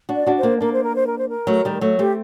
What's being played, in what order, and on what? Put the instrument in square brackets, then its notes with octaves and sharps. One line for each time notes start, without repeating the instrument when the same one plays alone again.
[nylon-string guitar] D4 F#4
[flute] D5
[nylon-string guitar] D4 F#4
[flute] C5
[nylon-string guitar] A#3 D4
[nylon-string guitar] A#3 D4 [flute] A#4
[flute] C5
A#4
C5
A#4
C5
A#4
[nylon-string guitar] F#3 A3
D#3 G3
F#3 A3
[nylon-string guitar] A3 C4 [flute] G4